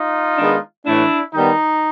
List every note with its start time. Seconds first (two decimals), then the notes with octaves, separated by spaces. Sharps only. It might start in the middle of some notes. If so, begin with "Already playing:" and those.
Already playing: D#4 F4
0.38 D#3 G#3 B3 D4
0.86 A2 E3 A3 D4 E4
1.34 D#3 G3 B3 D#4